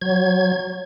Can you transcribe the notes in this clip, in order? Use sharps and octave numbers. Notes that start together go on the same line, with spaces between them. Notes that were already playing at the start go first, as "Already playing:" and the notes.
F#3 G#6